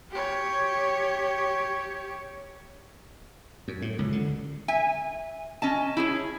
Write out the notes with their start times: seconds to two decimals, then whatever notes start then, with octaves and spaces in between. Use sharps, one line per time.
0.11 G4 C#5
3.68 F#2
3.82 A2
3.99 C#2
4.12 D3
4.68 E5 G#5
5.62 C#4 D#5 A5
5.97 E4 G#4 C#5